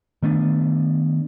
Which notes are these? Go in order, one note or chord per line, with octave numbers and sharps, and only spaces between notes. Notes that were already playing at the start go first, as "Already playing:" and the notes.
D#3 A3 B3 D4